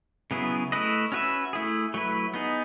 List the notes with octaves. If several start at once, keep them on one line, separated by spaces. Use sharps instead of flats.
C#3 F#3 B3 E4 G#4
A3 E4 B4 D#5
C#4 F#4 B4 E5
A3 E4 G#4
F#3 A3 E4 B4
B3 D#4 G#4